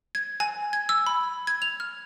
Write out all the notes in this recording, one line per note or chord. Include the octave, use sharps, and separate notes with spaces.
G#6
G#5
G#6
E6
B5
G#6
F7
F6